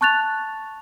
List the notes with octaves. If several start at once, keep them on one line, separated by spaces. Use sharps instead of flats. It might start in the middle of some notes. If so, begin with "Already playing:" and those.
A5 C#6 F#6 A6 F7